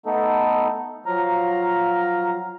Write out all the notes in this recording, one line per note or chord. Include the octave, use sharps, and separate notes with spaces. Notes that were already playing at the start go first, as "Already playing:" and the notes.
A3 B3 D#4 A4
F3 F#3 F5 A#5